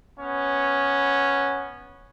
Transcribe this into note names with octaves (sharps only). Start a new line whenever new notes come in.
B3 C#4